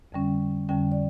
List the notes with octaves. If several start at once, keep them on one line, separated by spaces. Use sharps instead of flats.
F2 D3 G3 C#4
F2 D3 G3 C#4 G5
D5